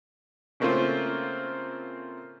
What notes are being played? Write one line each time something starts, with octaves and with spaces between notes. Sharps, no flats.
C#3 A3 A#3 C4 C#4 F4